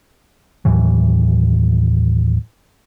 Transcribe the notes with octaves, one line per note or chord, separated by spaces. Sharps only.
D#2 A2 E3 F#3